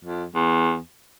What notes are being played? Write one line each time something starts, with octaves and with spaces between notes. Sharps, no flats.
F2
E2